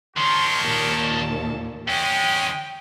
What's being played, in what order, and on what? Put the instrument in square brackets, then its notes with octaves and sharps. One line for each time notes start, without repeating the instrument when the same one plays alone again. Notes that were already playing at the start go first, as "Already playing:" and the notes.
[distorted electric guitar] D#3 D4 [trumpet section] G4 A#4 C#5 [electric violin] C6
[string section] D#2 A#2 [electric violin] A5
[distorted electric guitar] E2 C#4 [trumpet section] G#3 [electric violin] G5